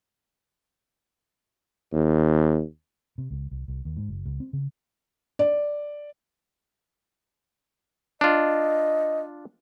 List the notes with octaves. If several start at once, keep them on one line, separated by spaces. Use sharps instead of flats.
D#2
C3
C#2
C2
C2
D#2
G#2
F#1
C#2
C4
C#3
D5
D4 F4 D#5